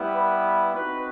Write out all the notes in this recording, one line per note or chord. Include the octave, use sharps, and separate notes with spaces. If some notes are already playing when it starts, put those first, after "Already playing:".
Already playing: G3 B3 E4
B4
C4 D#4 F#4 B4